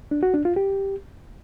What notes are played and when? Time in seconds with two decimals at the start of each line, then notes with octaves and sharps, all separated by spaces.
0.11 D4
0.23 F#4
0.34 D4
0.45 F4
0.56 G4